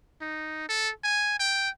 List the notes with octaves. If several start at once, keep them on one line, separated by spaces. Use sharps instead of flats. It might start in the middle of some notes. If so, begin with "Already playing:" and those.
D#4
A4
G#5
G5